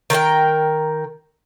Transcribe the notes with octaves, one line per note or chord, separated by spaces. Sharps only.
D#3 A#4 C5 G5